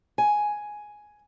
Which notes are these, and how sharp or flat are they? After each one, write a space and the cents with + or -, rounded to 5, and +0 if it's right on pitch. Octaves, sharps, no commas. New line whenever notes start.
G#5 +5